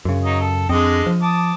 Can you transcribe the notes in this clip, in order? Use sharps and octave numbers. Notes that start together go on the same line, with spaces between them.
F#2 C#3
F#3 D#4 D#5
A4
F2 D3 G#3 C4 D#5
F3
A5 D6 D#6